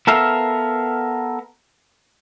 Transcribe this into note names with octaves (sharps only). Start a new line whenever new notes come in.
B3 A4 A#4 E5 F5